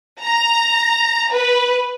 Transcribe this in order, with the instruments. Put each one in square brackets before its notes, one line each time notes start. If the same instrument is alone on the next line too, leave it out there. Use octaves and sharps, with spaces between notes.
[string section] A#5
B4